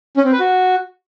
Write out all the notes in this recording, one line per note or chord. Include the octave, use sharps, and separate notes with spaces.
C#4
C4
B4
F#4